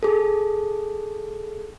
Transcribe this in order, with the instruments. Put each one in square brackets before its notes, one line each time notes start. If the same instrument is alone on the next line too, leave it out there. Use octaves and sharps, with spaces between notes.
[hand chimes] G#4 A4